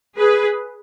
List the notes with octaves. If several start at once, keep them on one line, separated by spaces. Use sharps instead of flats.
G#4 B4